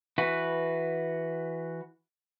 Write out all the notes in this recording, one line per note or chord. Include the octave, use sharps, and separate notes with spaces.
E3 F#4 B4